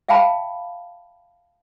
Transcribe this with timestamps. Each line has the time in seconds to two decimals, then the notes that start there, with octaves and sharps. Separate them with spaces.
0.09 E5 F5 G5 A5 B5